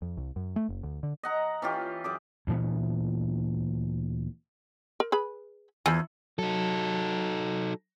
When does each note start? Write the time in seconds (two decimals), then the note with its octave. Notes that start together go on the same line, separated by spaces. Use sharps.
0.02 F2
0.17 C2
0.36 F#2
0.56 A3
0.69 F#1
0.83 D2
1.03 D3
1.23 D#5 F#5 A#5
1.62 E3 C#4 F4 G4
2.04 F#2 G#4 D6
2.47 D2 A#2 E3 B3
5.00 A#4
5.12 G#4 B4 B5
5.86 E2 F3 G#5
6.39 F#3 D#4 A4